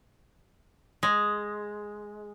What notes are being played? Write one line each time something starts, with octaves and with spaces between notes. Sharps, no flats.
G#3